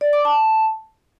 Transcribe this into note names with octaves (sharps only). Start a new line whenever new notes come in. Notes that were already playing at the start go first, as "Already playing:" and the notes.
D5
D6
A5